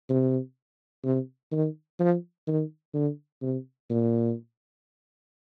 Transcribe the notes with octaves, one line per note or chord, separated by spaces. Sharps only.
C3
C3
D#3
F3
D#3
D3
C3
A#2